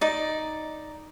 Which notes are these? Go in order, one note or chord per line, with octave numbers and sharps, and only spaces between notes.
D#4 D5